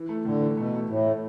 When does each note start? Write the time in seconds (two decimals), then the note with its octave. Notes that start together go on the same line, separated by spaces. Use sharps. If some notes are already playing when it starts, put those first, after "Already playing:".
Already playing: E3
0.09 A3
0.25 A2 D3
0.41 E3
0.57 B2 A3
0.74 A3
0.89 A2 E3
1.06 A3